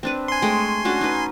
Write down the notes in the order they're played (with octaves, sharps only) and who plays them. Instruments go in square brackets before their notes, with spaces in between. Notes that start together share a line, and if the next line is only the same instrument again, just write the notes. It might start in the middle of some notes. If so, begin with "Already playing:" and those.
[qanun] C4 D4 B4
[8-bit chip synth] G#5 C6
[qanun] G#3 A3 G5
C#4 D4 F#4
D#4 B4